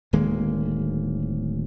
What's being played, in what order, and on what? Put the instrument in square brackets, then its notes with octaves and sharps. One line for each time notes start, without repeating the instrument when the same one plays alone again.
[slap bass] D1 D#3 G#3 A#3